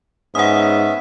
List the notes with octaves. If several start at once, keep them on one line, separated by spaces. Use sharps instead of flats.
G#2 B3 C#4 E5 F#5 D#6